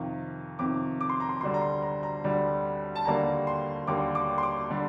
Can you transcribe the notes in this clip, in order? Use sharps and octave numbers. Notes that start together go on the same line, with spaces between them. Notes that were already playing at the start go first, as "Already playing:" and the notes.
Already playing: F2 C3 D#3 F5
F2 C3 D#3 D6
D6
C6
A#5
C6
D2 D3 G3 C6
A#5
C6
A#5
A#5
D2 D3 G3
A5
D#2 D3 G3 A#3 A#5
C6
D#2 D3 G3 A#3 D6
D6
C6
D6
D3 G3